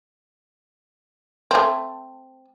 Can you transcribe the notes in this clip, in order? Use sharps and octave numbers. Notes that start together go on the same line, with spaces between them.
A3 C4